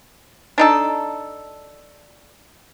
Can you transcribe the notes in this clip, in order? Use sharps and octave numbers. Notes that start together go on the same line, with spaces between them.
D4 D#4 A4